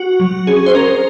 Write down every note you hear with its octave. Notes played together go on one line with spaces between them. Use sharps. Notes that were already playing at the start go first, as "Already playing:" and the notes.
Already playing: F#4
F#3
C#4 G#4
C5
C#4 A#4